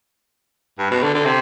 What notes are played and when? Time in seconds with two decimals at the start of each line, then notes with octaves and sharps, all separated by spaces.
0.79 G2
0.91 B2
1.03 D3
1.15 D3
1.25 C3